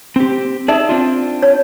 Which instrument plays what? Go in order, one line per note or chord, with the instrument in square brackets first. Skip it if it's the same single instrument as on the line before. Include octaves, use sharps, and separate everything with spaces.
[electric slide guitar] C4 G4
[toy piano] D#4 [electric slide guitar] G#4 D5 E5
[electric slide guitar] C4 D4 F4
[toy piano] C#5